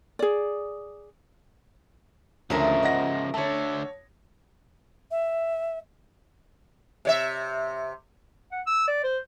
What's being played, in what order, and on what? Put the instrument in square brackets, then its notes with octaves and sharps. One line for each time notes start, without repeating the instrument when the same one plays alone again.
[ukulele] G#4 D5
[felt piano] D2 [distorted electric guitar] C#3 F3 [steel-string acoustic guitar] C#4 A#4 E5
[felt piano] D#5 F#5 A#6
[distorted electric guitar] D3 A3 [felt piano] C#5 A5
[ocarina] E5
[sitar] C3 C#5 E5
[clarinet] F#5
E6
D5
C5